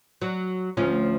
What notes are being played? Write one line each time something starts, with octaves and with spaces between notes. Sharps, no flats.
F#3
D2 F3 C#4